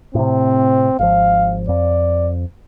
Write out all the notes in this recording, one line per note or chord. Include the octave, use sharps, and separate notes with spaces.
A2 C3 C4
G#1 F3 F5
F2 D5